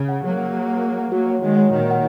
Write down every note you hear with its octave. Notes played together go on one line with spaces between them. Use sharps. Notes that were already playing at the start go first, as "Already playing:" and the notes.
Already playing: C#3
F#5
F#3 A#3 G#4
F#5
G#4
F#5
G#4
F#5
F#3 A#3 F#4
C#5 F#5
D#3 G#3 F#4
C#5 F#5
A#2 D#3 F#4
C#5 F#5